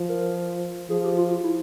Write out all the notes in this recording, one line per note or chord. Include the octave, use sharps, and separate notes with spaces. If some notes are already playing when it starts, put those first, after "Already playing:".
Already playing: F3
A#4
F3 G#4
G4
F4
F4
E4